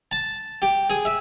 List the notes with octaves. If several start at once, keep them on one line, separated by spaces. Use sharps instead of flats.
A5
G4
G#4
E5